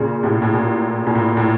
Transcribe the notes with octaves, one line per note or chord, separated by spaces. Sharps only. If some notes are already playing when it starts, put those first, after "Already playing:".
Already playing: A#2 C#3
A2 C3
A2
A#2
A#2
A2
A2